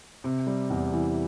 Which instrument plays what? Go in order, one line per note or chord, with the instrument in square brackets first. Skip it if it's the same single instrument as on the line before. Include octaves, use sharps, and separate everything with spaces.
[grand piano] C3
G3
E2
E3